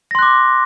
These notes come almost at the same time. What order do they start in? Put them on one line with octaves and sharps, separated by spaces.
A#6 C6 F#6 D6